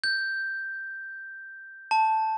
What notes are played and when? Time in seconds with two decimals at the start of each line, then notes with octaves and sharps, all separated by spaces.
0.04 G6
1.91 A5